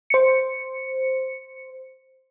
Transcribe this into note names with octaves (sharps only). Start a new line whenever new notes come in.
C5 C#7